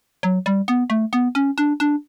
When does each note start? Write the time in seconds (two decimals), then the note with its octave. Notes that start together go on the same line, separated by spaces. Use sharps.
0.23 F#3
0.46 G3
0.68 B3
0.90 A3
1.13 B3
1.35 C#4
1.58 D4
1.80 D4